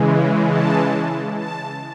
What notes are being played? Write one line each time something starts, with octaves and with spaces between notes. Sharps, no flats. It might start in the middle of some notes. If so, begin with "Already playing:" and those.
Already playing: C#3 E3 G#3
A5
A5